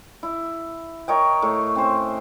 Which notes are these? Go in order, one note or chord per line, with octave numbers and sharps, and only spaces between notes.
E4
A#4 C#5 D#5 G5
A2
C4 C#4 C5